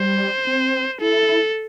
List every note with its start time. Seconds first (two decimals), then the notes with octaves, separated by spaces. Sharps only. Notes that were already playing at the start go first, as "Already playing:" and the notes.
Already playing: G3 C5
0.47 C4
1.01 E4 A4